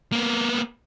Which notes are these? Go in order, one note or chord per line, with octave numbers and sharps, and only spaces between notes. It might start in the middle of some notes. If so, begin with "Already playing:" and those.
A#3 B3